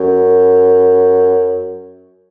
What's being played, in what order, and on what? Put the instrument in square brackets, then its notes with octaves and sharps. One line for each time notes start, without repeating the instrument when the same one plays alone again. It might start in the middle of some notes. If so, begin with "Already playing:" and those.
Already playing: [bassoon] F#2